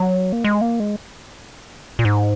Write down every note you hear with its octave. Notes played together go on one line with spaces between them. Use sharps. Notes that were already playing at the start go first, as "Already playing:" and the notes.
Already playing: F#3
A#3
G#3
A#3
G#3
A#2
G#2